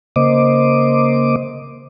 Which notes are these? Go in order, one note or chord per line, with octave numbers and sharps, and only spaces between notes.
C#3 A#3 C5 D#5 D6